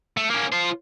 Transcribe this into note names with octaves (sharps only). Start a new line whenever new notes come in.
A3
A#3 C#4
F4 C5